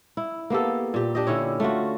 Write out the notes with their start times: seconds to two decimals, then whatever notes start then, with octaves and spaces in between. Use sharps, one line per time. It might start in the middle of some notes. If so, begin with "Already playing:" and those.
0.17 E4
0.50 A#3 B3 G4 A4
0.94 A#2 G4
1.15 D4 G4 D#5
1.27 D3 C#4 E4 C#5
1.60 A3 F4 F#4